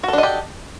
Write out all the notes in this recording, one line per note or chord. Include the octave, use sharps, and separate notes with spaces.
D4 F#4 G4 A4 D#5